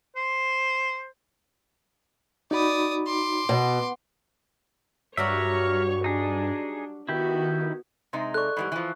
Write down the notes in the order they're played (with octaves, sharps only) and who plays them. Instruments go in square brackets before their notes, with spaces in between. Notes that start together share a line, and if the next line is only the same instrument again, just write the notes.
[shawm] C5
[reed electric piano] D#4 F#4 B5 [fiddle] D5 D#6
[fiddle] C6 D6
[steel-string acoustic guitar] B2
[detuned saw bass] G2 [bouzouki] F#3 G3 F#4 [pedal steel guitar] A#4 E5 [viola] C#5 C#6
[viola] D4 [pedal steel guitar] D#4 G#4
[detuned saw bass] D#3 [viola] B3 F#4 [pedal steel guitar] E4 G4
[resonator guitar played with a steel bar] C3 G#3 D#4 [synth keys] E5 C6
[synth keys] A4 D5 [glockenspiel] C#6 F#6
[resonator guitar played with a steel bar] G#2 E3 G3 [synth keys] B5
[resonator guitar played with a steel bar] E3 F3